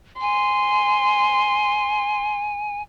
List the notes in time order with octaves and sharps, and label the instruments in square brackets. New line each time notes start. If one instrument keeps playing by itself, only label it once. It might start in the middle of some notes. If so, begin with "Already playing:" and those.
[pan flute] G#5 [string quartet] C6